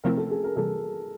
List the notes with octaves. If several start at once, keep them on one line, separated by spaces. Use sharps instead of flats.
C3 F3 A3 C4 E4 A#4
A4
G#4
A#4
C3 E3 G3 A4